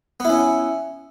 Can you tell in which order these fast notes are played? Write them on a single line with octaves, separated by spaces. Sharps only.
B3 E4 C#4